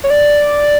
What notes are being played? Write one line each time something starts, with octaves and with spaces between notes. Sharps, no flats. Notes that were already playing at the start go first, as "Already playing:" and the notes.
C#5
D5